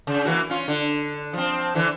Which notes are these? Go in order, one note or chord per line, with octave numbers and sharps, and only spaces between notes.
C#3
E3 A#3 F#4
C#4 F4
D3
F3 C4
D3 E3